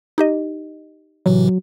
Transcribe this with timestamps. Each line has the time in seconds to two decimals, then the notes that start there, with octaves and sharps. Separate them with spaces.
0.18 D#4 G4 D#5
1.26 A2 C3 E3 F#3